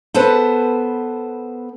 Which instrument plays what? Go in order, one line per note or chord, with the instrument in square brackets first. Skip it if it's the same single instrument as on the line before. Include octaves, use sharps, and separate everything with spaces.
[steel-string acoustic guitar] B3 A4 B4 C5